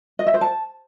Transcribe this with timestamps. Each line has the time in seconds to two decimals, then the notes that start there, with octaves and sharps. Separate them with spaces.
0.19 D#5
0.27 E5
0.34 C5
0.41 A5